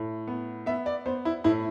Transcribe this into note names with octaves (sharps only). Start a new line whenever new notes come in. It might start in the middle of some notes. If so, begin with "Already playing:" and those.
Already playing: A2
B3
B3 E5
D5
B3 C5
E4
A2 E4